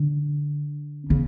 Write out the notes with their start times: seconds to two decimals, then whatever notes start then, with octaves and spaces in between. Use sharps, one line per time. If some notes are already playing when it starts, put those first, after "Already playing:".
Already playing: D3
1.10 C#3